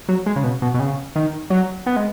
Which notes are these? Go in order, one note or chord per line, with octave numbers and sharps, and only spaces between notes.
F#3
G#3
C#3
B2
B2
B2
C#3
D#3
F#3
B3
G#3